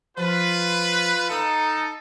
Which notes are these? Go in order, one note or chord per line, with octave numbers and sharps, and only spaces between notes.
F3 F4 B4
D#4 A4 F5 D#6